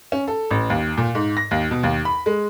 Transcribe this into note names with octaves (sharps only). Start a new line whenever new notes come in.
C#4
A4
A1
D#2
A#2
G#2
A#6
D#2
B2
D#2
B5
G#3